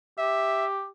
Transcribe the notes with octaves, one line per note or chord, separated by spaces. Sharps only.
G4 E5